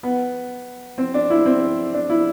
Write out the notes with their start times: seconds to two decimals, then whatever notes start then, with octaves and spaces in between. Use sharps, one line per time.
0.03 B3
0.98 C4
1.14 D4
1.30 E4
1.46 C4
1.94 D4
2.10 E4